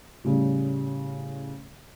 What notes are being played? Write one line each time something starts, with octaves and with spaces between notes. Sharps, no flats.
A2 C#3 G3